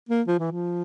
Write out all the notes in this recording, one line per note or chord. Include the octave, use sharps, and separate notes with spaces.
A#3
F3
E3
F3